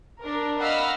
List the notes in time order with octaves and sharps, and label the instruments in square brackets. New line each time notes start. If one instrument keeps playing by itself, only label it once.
[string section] D4 A#4
D#5 F5 F#5 B5 E6 F6